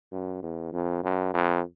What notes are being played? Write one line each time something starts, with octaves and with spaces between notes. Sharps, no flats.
F#2
E2
F2
F#2
F2